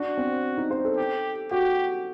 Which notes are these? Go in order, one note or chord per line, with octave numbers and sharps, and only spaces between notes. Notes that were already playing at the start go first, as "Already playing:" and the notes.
Already playing: D4 F#4
C4
D#4
C5
A4
G4
F#4 G4